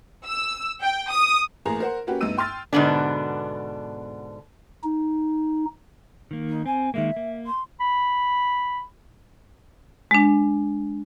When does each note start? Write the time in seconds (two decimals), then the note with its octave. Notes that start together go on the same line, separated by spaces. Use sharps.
0.24 E6
0.81 G5
1.10 D#6
1.65 A1 A#3 G#4 A#5
1.80 A#4 C5 F#5
2.07 A#3 C#4 F#4 G4 B4
2.21 D2 G2 B3 D#4 E6 D#7
2.38 G5 C6 F6 A6
2.73 G#2 B2 D3 B3 D4
4.84 D#4
6.31 D#3 A#3
6.48 D#4
6.66 C4 G#5
6.94 D#3 G#3 A#3 E5
7.17 A#3
7.46 C6
7.80 B5
10.11 G#3 D4